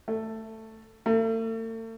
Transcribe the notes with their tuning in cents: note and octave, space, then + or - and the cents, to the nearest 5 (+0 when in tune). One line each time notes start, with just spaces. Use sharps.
A3 +10
A3 +40